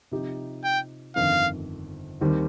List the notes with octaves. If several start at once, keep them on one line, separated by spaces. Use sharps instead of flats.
C3 F3 D#4 G4
G5
G1 F2 D#3 F5
D#2 D#3 G3 C4